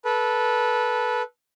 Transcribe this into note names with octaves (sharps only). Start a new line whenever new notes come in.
A4 B4